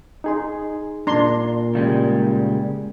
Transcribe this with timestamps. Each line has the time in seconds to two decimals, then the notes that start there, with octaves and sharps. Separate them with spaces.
0.24 D#4 G#4 C6
1.07 A#2 D4 A#5 C6
1.75 C#3 G3 G#3